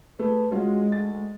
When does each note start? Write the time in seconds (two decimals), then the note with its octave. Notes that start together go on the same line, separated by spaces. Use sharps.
0.19 A3 G#4 B4
0.51 G#3 C#4 F4 F#4
0.92 D2 A6